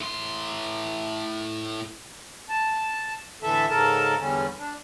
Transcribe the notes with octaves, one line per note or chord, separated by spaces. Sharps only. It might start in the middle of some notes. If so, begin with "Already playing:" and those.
A2 C6
A5
A2 D3 E3 A4 E5 A5
G#2 C#3 A4 A#4 A5
E2 D3 G3 C#4
D4